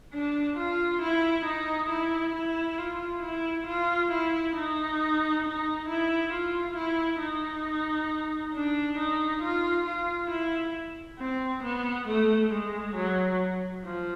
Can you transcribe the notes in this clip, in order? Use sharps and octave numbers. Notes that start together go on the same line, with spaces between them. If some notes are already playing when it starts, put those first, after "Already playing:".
D4
F4
E4
D#4
E4
E4
F4
E4
F4
E4
D#4
D#4
E4
F4
E4
D#4
D4
D#4
F4
F4
E4
C4
B3
A3
G#3
F#3
F3